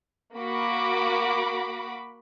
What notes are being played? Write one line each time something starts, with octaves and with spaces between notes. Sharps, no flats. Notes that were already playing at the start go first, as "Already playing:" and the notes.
A#3 F#4 B5 D6